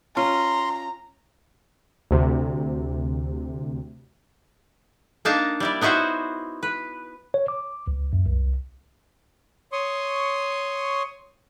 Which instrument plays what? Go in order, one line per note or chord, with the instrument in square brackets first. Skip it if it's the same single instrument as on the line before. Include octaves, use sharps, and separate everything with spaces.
[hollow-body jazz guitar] C#4 F4 [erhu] A#5 [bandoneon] C6
[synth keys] D2 C3
[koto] A#3 D4 D#4 F5 A5 A#5
G3 E4 D5
B3 D#4 E4 F#4 C5 C#5
B4
[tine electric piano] C#5
D6
C#2
F#2
C2
[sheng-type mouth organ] C#5 C6 C#6 D#6